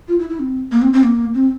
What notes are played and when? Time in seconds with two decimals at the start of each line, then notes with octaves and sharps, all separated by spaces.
0.08 F4
0.19 E4
0.30 E4
0.40 C4
0.72 A#3
0.82 C4
0.93 C4
1.03 A#3
1.34 C4